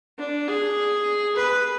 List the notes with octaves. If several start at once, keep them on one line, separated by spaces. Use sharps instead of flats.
D4
G#4
B4